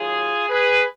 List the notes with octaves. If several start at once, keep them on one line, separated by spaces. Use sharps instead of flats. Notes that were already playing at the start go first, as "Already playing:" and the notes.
Already playing: D#2 D#3 F#3 F4 G#4
G#4 B4